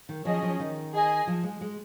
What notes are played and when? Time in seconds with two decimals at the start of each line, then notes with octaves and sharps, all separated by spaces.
0.09 D#3
0.25 F3 C#4 G#4 D#5
0.42 F3
0.60 D#3
0.93 G#4 D#5 G#5
1.27 F3
1.44 G#3
1.61 G#3